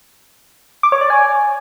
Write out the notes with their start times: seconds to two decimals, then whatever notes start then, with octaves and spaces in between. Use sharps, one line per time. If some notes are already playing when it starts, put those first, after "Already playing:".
0.83 D6
0.92 C#5
1.01 D5
1.10 G#5